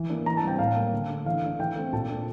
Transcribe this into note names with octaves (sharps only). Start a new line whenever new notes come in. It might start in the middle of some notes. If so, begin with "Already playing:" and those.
Already playing: E3
A#3 D4
E3 A#5
A5
G3 C4 G5
A2 F5
G3 A#3
D3
A3 D4
E3 F5
A3 D4
E3 G5
A3 C4
A#2 A5
A3 D4